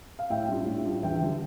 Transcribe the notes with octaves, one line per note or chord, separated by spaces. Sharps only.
F5
A2 E5 G5
G3 D4 F4
A2
G3 D4 F4
E2 E5 G5
D3 G3